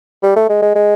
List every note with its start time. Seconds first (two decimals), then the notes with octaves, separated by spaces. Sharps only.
0.23 G3
0.36 A3
0.49 G#3
0.62 G#3
0.75 G#3